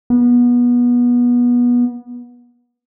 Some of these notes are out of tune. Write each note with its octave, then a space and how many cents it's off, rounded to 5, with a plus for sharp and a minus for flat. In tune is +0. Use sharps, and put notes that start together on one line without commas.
B3 -25